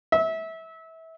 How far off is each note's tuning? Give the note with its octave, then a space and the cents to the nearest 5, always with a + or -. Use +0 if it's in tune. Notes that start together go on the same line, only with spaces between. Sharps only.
E5 -25